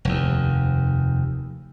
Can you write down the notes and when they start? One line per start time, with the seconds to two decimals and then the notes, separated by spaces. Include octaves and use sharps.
0.05 F1 D#2